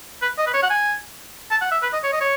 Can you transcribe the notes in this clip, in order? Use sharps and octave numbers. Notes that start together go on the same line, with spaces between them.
B4
D#5
B4
C#5
F#5
G#5
A5
F#5
E5
B4
D#5
C#5
D#5
C#5